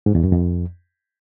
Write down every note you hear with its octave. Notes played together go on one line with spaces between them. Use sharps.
G#2
E2
F#2
F2